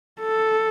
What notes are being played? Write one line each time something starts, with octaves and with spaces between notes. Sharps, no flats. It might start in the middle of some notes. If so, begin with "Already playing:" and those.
A4